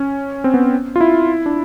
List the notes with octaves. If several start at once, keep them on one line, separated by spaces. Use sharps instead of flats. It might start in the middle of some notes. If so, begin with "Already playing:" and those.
Already playing: C#4
C4
B3
F4
E4
D4